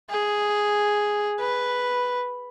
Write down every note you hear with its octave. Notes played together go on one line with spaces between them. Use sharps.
G#4
B4